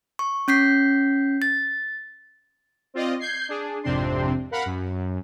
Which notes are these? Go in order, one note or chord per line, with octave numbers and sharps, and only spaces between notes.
C#6
C#4 G6 B6 C7
A6
C4 F4 D5 D#5
G6 G#6 C7
D4 G#4
G#1 F2 C3 C4 D4 C6
A#4 F5 F#5 B5
F#2